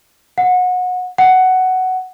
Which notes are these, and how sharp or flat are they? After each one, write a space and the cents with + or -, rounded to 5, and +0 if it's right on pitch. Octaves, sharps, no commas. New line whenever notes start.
F#5 -25
F#5 +10